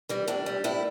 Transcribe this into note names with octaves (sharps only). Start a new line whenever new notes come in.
E3 G3
A2 D4
G3
A2 E4